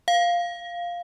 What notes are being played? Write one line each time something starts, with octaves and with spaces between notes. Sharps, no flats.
F5